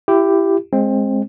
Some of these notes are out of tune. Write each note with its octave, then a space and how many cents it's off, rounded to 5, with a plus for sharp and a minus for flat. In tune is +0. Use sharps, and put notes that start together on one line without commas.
E4 +25 G4 +0
G#3 +0 C4 +20